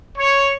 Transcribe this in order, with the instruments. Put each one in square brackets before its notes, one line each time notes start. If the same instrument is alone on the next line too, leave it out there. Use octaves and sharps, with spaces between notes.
[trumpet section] C#5